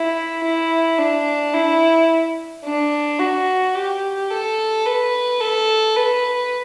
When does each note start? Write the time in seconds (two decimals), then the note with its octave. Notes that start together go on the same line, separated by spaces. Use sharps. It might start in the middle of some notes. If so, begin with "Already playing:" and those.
Already playing: E4
0.43 E4
0.98 D4
1.54 E4
2.64 D4
3.19 F#4
3.75 G4
4.31 A4
4.85 B4
5.41 A4
5.96 B4